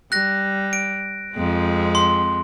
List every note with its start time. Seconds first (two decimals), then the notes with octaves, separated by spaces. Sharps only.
0.12 G3 F#6 A#6
0.73 D7
1.34 F2 G#3 C4
1.95 C6